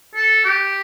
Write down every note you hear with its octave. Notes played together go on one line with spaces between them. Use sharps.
A4
G4